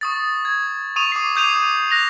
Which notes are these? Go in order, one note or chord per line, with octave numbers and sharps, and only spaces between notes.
C#6 D#6 A6
G#6
C#6 D#6 D#7 F7
D6 C7
D6 D#6 G6 C7 D#7 F7
F#6 A#6 F7